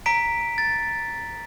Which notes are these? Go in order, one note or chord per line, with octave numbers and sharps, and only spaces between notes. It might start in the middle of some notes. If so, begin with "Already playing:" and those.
A#5 B6 D7
A6